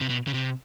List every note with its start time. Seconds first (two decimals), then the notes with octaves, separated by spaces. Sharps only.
0.01 C3
0.09 B2
0.27 C#3
0.34 C3